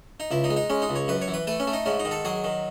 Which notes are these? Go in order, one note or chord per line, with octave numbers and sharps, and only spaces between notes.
D#4
C#2 E4
D#4
G#3
D#4
G#3 C#4
D#4
C#2
C#5
F#2 B4
C#5
E3
B4
A3 B4
C#4
A3
D#4
G#2 C#4
D#4
D#3
A4
F#3 G#4
D#3